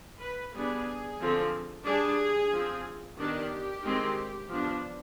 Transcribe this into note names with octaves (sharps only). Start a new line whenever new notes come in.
B4
G3 B3 D4 G#4
D3 F3 C4
G3 D4 G#4
F3 C4
D#3 B3 D4 G4
D#3 G#3 C4
F3 B3 D4